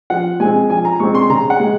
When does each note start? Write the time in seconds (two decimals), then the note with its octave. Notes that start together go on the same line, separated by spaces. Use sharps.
0.10 F3 F#5
0.40 G#3 C4 G#5
0.70 F3 G#5
0.85 A#5
1.00 G#3 C4 C#6
1.15 C6
1.30 C#3 A#5
1.50 F#5
1.60 G#3